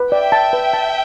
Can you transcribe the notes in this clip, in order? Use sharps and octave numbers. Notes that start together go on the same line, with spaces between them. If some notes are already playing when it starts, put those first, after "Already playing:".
Already playing: B4
D5 E5 G5
A5
B4
A5